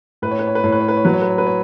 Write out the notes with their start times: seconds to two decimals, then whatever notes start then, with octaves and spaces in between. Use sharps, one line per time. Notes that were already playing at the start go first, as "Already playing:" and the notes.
0.22 A2 B4
0.31 C#5
0.39 B4
0.47 C#5
0.55 B4
0.64 A2 C#5
0.72 B4
0.80 C#5
0.88 B4
0.97 C#5
1.05 F#3 B4
1.14 C#5
1.22 B4
1.29 C#5
1.38 B4
1.47 C#5